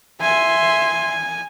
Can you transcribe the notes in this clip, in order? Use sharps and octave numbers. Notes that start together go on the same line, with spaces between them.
E5 G#5 C6